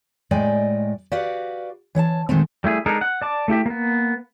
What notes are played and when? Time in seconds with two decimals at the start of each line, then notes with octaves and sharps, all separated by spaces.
0.31 A2 G#3 D5 D#5 G5 G#5
1.12 F#4 G4 B4 D5 F5 F#5
1.95 E3 C#5 F#5 A5
2.29 A#2 D#3 G#3 A3 C4
2.64 G3 A3 E4 G#4
2.86 G#3 D4 D#4 A4 A#4
3.01 F#5
3.22 D5 A5 D6
3.48 A3 E4 G4 E5
3.66 A#3 B3